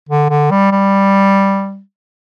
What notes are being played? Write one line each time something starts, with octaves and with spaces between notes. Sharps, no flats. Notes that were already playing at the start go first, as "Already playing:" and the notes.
D3
D3
G3
G3